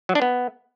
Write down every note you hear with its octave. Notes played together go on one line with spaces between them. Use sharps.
F#3
D4
B3